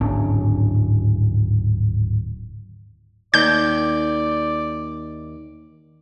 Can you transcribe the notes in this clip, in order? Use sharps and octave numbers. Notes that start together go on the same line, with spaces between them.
D1 G#1 C#4 D4
D#2 D5 G6